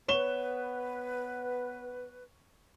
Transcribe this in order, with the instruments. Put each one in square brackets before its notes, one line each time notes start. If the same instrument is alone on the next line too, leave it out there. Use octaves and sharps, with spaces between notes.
[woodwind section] B3 B4 [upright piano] C#5 E7 G7